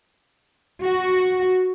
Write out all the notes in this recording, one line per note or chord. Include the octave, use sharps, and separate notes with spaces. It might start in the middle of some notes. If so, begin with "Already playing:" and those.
F#4